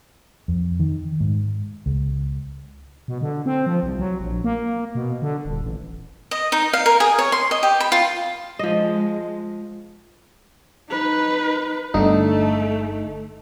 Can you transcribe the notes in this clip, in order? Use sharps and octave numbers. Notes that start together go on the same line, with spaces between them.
F2
D#3
G#2
C#2
B2
D3
C4
F3
C2
F#3
A#1
A#3
B2
D3
D#1
A1
D#5
D#4
F5
A#4
G#4
C#5
C6
D#5
G4
B5
F4
F3 G#3 D#5
D#4 B4
G1 D3 A3 D#4